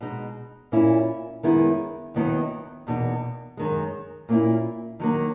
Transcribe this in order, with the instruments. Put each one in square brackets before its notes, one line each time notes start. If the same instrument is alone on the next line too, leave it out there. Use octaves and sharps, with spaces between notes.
[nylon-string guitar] B2 G#3 D#4
A#2 A#3 C#4 E4
F#2 D#3 G#3 B3 E4
D#2 D#3 F#3 B3 E4
E2 B2 A#3 D#4
F#2 D#3 G#3
A#2 A#3 C#4 E4
D#3 F#3 A#3 D#4